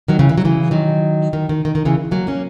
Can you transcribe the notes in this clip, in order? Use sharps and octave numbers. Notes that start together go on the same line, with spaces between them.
D#3 F#3
C#3 E3
E3
F#3
C#3 E3
D#3 F#3
D#3
D#3
D#3
D#3
C#3 E3
F#3 A#3
A#3 C#4